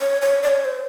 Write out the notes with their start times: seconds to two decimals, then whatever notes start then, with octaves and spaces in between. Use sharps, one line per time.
0.01 C#5
0.22 C#5
0.43 D5
0.47 C#5
0.65 C5